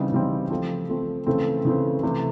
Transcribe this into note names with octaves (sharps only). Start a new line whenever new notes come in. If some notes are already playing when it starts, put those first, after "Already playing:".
Already playing: C#3 E3 G3 C4 D#4
C#3 E3 G3 C4 D#4
F3 A3 C4
F3 A3 C4
C#3 E3 A3 C4
C#3 E3 A3 C4
C3 E3 A3